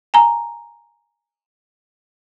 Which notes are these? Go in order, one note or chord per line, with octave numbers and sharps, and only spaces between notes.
G#5 A#5